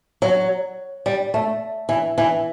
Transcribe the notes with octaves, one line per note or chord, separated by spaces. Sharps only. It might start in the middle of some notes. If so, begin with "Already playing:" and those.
F#3
G3
A3
E3
E3